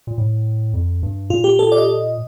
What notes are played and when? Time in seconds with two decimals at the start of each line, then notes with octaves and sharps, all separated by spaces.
0.07 A#2
0.18 A2
0.73 F2
1.03 G2
1.30 A#2 F4
1.44 G4
1.59 A4
1.72 D5
1.78 D#5